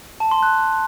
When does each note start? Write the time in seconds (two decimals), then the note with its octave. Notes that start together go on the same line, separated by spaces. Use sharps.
0.20 A5
0.31 C6
0.43 F#6